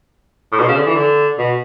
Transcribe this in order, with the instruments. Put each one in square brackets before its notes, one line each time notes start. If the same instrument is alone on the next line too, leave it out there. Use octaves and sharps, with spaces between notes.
[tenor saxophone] A2
B2
C#3
D3
E3
D3
B2